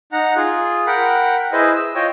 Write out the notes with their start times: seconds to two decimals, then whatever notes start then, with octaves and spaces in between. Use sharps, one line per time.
0.12 D#4 F#5 A#5
0.36 F4 G#4
0.87 A#4 F#5 G5 B5
1.52 E4 G#4 B4 C5 D#5
1.75 E6
1.95 F4 C#5 D#5 G5